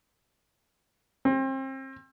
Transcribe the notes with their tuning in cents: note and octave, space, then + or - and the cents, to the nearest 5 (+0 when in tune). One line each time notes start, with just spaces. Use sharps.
C4 +35